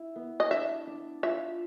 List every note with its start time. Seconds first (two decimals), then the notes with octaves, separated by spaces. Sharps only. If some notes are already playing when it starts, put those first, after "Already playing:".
Already playing: E4
0.16 B3
0.40 D#5
0.51 D4 E5
0.87 D4
1.23 F4 E5